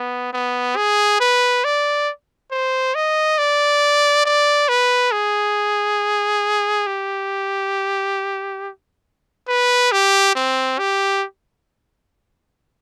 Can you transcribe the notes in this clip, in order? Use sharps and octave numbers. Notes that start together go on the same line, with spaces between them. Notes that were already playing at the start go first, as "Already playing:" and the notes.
Already playing: B3
B3
G#4
B4
D5
C5
D#5
D5
D5
B4
G#4
G4
B4
G4
C4
G4